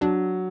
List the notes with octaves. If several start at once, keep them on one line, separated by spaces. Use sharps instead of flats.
F#3 D4